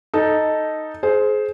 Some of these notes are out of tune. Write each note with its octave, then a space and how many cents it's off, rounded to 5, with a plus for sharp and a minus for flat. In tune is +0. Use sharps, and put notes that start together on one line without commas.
D#4 +0 A4 +0
G#4 +30 C5 +0